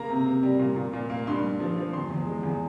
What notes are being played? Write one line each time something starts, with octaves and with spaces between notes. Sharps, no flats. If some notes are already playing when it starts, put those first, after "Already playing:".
Already playing: C#3 A#3 A#5
C3
C3
G3
A#2
A#2
A#2
A#3
G2 C6
G2
F3
F3
E2 C6
E2
G#3
E2